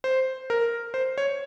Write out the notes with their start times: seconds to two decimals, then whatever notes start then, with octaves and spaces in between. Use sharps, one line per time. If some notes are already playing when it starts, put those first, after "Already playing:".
0.04 C5
0.50 A#4
0.94 C5
1.18 C#5